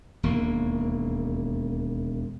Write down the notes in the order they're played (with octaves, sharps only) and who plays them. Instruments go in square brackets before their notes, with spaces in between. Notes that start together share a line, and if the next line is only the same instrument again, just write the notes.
[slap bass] E1 D#2 A#3